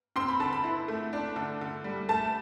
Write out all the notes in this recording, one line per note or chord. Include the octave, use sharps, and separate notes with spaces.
C4 C6
B5
D3 A5
B5
E4
A3
D4
D3
D3
G3
A3 A5